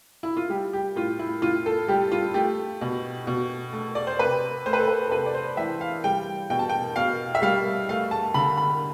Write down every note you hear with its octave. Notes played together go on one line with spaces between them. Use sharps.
E4
F4
G3 G4
G4
A2 F4
E4
A2 F4
A4
G3 G4
F4
A3 G4
B2
B2
A3
D5
C5
C3 B4
A3 C5
B4
A4
B4
A4
C3 B4
D5
C5
E3 E5
F5
G3 G5
B2 G5
A5
G5
B2 F5
E5
G3 F5
A3 F5
A5
D3 B5
B5